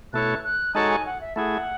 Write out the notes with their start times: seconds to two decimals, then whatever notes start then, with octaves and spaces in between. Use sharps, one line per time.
0.13 B2 A3 E4 A4 C#5 F#6
0.44 F#6
0.75 G#3 D#4 F#4 A4 C#5 A5
0.90 G#5
1.06 F#5
1.21 E5
1.36 A3 E4 G#4 F#5